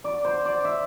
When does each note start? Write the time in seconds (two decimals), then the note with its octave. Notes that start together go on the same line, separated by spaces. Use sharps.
0.04 D5
0.24 C5
0.45 D5
0.65 E5